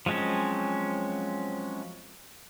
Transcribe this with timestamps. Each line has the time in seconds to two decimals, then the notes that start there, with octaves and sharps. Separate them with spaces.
0.06 F3 F#3 G#3 C4 C#4